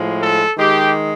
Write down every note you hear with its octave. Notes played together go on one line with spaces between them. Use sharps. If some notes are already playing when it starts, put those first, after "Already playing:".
Already playing: A2 F3 G#3
A4
D#3 G#3 G4